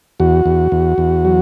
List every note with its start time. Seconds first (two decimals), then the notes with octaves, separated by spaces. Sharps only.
0.20 E2 F#4
0.46 E2
0.72 E2
0.98 E2
1.25 F#3